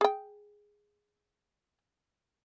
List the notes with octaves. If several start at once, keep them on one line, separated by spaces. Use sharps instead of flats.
G#4 G5